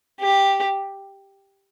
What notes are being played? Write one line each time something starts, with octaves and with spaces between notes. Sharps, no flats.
G4